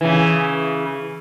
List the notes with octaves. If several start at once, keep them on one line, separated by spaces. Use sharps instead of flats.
C#3 E3